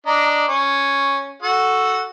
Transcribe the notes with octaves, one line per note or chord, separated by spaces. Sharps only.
D4 D#5 A#5
C#4
F#4 A4 F#5